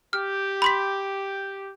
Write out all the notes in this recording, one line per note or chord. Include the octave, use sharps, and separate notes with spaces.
G4 F6
B5 C6 B6